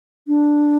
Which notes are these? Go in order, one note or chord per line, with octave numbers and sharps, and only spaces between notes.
D4